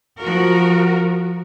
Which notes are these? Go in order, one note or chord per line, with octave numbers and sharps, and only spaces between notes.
F3 F#4 A#4